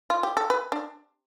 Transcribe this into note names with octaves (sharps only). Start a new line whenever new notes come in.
F4
G4
A4
B4
D4